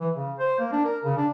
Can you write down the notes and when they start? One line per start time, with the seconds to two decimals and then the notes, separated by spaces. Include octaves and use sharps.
0.01 E3
0.15 C#3
0.39 C5
0.59 A#3
0.72 D4
0.85 A#4
1.04 C#3
1.17 D4